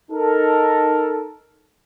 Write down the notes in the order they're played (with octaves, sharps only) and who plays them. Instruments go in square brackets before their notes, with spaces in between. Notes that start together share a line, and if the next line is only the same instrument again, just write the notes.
[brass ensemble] D#4 A4 A#4